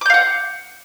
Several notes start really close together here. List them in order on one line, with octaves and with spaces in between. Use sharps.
D6 G6 F5 F#5